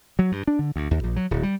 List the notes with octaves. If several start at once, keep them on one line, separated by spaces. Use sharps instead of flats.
F#3
G2
D4
D3
D2
D#2
A#1
F#3
D1
G3